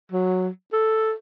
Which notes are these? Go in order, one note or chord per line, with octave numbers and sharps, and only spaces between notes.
F#3
A4